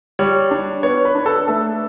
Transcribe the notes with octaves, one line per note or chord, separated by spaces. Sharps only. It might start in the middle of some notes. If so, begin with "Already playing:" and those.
G3 C#5
D4
B3 C#5
B4
D4
A4
A3 A4